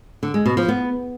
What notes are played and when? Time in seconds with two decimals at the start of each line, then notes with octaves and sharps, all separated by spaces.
0.23 D3
0.34 G#3
0.46 B2
0.57 F3
0.68 B3